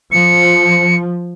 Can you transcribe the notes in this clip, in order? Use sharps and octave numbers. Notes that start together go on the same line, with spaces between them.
F3 C#7